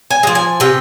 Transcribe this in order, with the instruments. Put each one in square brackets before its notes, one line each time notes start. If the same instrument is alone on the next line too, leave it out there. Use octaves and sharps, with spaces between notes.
[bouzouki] G#5
G#3
F3
G#5
C3 G5